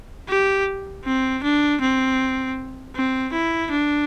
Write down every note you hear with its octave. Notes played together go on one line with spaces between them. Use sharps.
G4
C4
D4
C4
C4
E4
D4